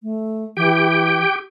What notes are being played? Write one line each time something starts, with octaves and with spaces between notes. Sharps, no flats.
A3
E3 G4 G5